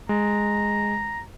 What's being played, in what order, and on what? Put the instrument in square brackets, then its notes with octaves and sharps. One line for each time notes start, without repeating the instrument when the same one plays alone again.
[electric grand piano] G#3 [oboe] A#5